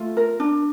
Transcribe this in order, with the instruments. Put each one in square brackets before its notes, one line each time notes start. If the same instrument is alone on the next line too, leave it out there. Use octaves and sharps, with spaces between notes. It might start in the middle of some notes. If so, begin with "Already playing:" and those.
Already playing: [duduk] A3 [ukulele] F4
[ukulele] A#4
D4